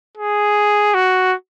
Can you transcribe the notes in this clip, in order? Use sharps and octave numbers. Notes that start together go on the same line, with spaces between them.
G#4
F#4